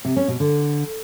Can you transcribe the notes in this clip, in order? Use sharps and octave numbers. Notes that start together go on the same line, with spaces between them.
C3
C#4
B2
D3